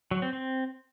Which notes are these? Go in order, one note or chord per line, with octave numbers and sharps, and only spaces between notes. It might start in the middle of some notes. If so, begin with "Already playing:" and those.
F#3
C4
C4